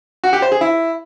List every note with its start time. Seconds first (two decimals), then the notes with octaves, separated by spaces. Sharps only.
0.24 F#4
0.33 G4
0.42 C5
0.52 G#4
0.61 E4